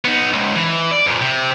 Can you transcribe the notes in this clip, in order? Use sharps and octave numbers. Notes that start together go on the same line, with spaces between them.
B3 D#4
C#2 G#2
E3
D5
F2 A#2
C3